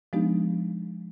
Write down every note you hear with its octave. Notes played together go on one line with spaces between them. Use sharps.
F3 G#3 B3 D4 D#4 G4